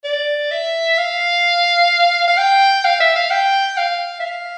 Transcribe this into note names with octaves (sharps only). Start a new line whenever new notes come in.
D5
E5
F5
F5
G5
F5
E5
F5
G5
F5
E5
F5